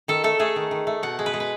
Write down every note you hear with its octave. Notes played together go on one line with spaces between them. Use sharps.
D#3 A4
A3 A4
A3 G#4
D#3
D#3
A3
B2 F#5
G#3
B4
G#3
B4